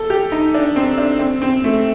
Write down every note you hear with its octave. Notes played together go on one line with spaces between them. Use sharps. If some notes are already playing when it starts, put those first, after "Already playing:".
Already playing: A4
G4
D#4
D4
C4
D4
C4
C4
A3